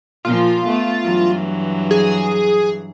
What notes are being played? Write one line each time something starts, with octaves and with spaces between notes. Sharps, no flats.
A#2 F3 F4
A3 B3
G2 E3 F#3
G#4